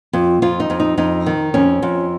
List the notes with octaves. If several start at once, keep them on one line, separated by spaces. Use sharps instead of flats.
F2
F2 F4
D#4
F2
D#4
F2 D#4
D#3
F2 C#4
F2